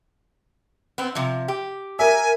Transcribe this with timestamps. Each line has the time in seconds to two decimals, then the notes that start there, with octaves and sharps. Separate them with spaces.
0.98 B3 C4
1.15 C3 F3
1.48 G4
1.99 A#4 E5 G#5